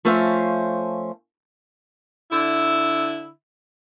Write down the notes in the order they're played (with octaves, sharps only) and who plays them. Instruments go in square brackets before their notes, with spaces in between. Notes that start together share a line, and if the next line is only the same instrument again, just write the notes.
[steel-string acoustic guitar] F3 A3 C#4 C5 E5 F5
[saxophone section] D3 E4